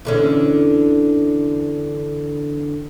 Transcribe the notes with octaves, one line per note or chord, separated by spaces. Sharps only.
E2 D3 C#4